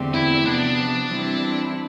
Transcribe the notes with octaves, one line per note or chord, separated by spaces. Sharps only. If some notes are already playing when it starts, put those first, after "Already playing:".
Already playing: E2 D3 A3 C4 G4
E4
C3 F3 B3 D4
E3 G3 C4 E4